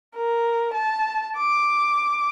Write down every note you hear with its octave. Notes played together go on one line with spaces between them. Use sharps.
A#4
A5
D6